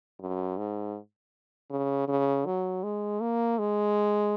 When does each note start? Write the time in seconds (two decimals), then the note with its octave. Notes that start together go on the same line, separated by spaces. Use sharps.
0.20 F#2
0.57 G#2
1.70 C#3
2.08 C#3
2.46 F#3
2.83 G#3
3.20 A#3
3.58 G#3